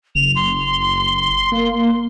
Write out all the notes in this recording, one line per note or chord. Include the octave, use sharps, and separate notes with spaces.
F#1 F7
C6
A#3